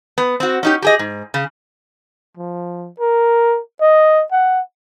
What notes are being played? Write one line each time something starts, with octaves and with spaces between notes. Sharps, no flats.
B3
C4 F#4
C#4 D#4 G4
G4 G#4 D#5
G#2
C#3
F3
A#4
D#5
F#5